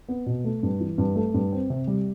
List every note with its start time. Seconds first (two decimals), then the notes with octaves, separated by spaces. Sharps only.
0.09 B3
0.26 B2
0.44 A3
0.63 G2
0.80 E3
0.98 G2
1.16 A3
1.34 G2
1.52 C4
1.70 C3
1.87 G3